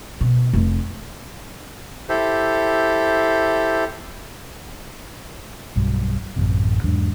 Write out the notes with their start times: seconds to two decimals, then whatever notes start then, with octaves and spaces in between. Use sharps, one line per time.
0.21 B2
0.53 F1
2.09 E4 G4 A4 C5
5.76 B1 G2 F#3
6.36 A1 F#2 C3
6.84 E2 G#2 F#3 D4